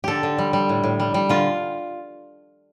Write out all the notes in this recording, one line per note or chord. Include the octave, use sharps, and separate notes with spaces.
D3 G4 A4
D3
G3
G3
A2
A2
G3
G3
D3 F4